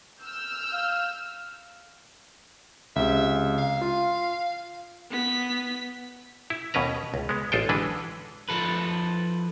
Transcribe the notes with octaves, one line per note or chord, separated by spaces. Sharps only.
E6 F6 G6
F5
C#2 C3 E5
F5
F4
B3 B6
E4
D#2 B2 C#4 B4 A#5
C#2
G#3 B3
A1 F4 A4 G5
D3 E3 G#3 D4 B4
F3 A4 B4